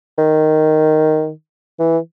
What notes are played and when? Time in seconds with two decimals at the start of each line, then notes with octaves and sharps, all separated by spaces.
0.18 D#3
1.79 E3